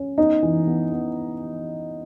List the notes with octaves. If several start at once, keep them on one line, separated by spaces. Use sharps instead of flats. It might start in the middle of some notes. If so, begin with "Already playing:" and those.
Already playing: C#4
B3 D#4
E3
B3
B3